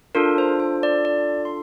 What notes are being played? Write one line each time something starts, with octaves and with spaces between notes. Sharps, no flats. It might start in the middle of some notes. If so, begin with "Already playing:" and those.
D4 F4 A4 A#4
C5
C5
D5
D5
C6